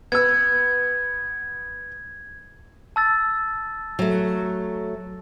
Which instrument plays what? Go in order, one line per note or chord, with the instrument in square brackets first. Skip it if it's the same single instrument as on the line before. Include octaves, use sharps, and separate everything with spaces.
[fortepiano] B3 E6 [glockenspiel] G#6
[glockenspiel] A5 E6 A6
[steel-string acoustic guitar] F#3 A3